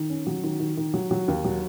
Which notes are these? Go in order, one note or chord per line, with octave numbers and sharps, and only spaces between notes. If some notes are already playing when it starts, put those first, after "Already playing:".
Already playing: D#3
C#4
F#3
D#3
D#3
D#3
F#3
F#3
D#2
F#3